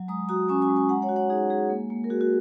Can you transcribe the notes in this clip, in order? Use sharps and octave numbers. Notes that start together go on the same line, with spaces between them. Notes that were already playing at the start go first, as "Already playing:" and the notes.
Already playing: F#3
G#3 A#5 D#6
F#4 A#5 D#6
C#4 G#5 C#6
G#5 C#6
G#3
G#5 C#6
G#3 F#5 A#5
C#5 F#5
F#4
C#5 F#5
D#4 G#4
G#3 G#4
A#3
A#3
A#4
F#4 G#4
F#4